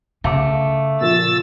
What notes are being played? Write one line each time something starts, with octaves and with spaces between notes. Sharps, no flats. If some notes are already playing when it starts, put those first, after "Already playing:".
C#3 A3 F5 D6
A#2 F3 E6 A6